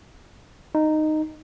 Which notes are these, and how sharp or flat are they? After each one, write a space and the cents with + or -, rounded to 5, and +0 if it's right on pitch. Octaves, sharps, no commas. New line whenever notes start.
D#4 -10